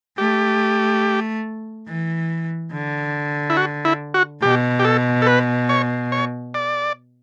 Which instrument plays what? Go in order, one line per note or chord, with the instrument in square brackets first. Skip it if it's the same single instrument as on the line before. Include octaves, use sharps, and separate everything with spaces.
[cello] A3 [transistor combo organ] G4
[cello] E3
D3
[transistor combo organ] E4
F#4
E4
F#4
[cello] B2 [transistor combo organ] G4
[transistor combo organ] G4
A4
A4
B4
C#5
C#5
D5